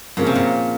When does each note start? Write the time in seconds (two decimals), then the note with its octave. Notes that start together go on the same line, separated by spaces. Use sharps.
0.17 A#2 F3 A#3 C#4 G#4
0.26 C3
0.35 A#2